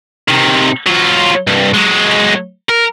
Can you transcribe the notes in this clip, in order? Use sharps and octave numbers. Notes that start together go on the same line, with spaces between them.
C3 D#3
F#3 F4
C2 G2
F#3 G#3
A#4